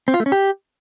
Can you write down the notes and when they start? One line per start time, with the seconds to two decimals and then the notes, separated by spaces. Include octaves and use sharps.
0.08 C4
0.14 F4
0.20 A3
0.26 C#4
0.32 G4